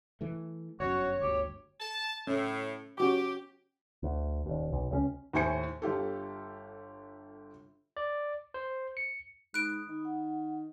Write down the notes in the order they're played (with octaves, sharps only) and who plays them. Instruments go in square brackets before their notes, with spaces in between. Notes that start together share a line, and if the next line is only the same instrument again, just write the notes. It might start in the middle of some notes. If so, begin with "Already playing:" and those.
[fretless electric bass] E3 A3
[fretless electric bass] G1 F#2 [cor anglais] F#4 [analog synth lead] C#5
[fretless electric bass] G1 D2 [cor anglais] G4
[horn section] A5
[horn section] A2 [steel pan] C#4
[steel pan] C#4 F#4 D6 [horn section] G4
[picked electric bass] D2
D#1 D#2
B1
C#2 F#3 C#4
[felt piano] D#2 A2 E4 C5 G#5 C#7
G1 F4 G4 A4
[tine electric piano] D5
C5
C#7
[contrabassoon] G#2 [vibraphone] B5 D#6 [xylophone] F#6 D7
[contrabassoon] D#3
[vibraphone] F#5